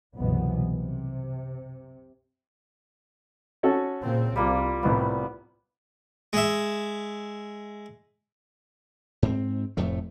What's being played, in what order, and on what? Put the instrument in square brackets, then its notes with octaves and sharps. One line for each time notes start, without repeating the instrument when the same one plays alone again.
[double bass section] F#1 C2 B2 E3 B3
C3
[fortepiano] C#4 F#4 A4
[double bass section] A#2 C#3 C4
[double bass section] C2 [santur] G3 A#3 F4
[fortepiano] C2 C5 [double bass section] A2 [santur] B3
[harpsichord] G#3 E5
[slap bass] G#2 C4
F1 F2 A2 A3